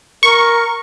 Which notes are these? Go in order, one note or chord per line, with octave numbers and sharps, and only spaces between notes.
A#4 C#6